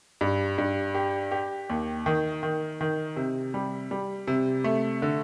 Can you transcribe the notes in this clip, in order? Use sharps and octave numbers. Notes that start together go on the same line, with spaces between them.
G2
G2
G4
G4
D#2
D#3
D#3
D#3
C3
G3
G3
C3
A3
D3